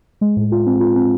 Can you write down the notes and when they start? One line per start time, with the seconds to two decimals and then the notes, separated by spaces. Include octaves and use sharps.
0.21 G#3
0.36 A2
0.52 F4
0.67 C4
0.80 F4
0.96 C4